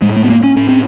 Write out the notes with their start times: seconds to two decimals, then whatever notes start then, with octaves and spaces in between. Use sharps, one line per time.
0.02 A2 G#3
0.16 A3
0.24 B3
0.30 A#3
0.43 C#4
0.56 A2 C#4
0.69 C4